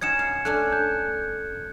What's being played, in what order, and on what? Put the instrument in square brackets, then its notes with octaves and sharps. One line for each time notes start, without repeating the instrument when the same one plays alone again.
[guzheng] C#4 D#4 F#4 [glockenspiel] G#6 C#7 E7
[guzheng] F5
[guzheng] A3 C#4 D4 [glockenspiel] F#6
[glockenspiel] G6